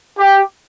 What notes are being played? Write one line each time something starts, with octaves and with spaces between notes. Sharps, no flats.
G4